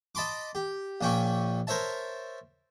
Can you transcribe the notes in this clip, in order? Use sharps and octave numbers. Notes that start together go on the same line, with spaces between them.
D#5 A5 B5 C6 D6
G4
A#1 A#2 C#4 G5 C#6
A#4 C5 C#5 E5 A5